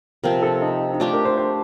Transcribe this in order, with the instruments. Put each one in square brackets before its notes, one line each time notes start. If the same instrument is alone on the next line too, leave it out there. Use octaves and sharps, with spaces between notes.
[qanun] C3 F3 C4 [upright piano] A#4
[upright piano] A4
D#4
D#4
[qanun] A3 D4 G4 [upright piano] F4
[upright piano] A#4
C5
C5